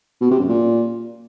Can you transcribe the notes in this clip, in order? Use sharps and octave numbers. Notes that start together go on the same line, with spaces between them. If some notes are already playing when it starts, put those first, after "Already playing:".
B2
C3
F#2
A#2